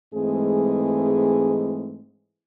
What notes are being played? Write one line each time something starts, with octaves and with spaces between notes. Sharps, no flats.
G#2 E3 G#3 A3 C4 G#4